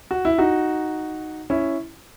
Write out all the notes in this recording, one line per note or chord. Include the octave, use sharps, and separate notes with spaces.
F#4
E4
D#4 F#4
C#4 E4